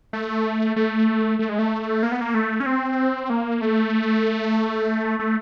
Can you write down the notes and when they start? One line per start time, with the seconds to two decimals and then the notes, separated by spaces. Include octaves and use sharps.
0.13 A3
0.76 A3
1.39 A3
1.49 G#3
1.59 A3
2.03 A#3
2.12 B3
2.21 A#3
2.34 A3
2.60 C#4
2.66 C4
3.30 A#3
3.61 A3
5.19 A3